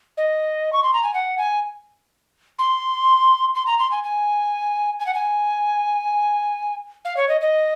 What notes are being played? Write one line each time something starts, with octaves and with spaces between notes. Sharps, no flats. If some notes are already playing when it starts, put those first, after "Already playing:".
D#5
C#6
C6
A#5
G#5
F#5
G#5
C6
C6
A#5
C6
G#5
G#5
G#5
F#5
G#5
F5
C#5
D#5
D#5